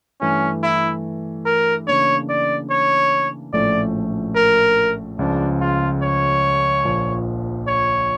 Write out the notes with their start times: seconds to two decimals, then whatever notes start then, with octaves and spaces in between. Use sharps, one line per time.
0.21 G2 E3 A3 C#4
0.63 E4
1.46 A#4
1.87 C#3 E3 A#3 D4 C#5
2.29 D5
2.70 C#5
3.53 A#1 A2 F3 A3 C#4 D5
4.36 A#4
5.19 C#2 C#3 F3 D4
5.60 F4
6.02 C#5
6.85 A#1 A#2 F3
7.68 C#5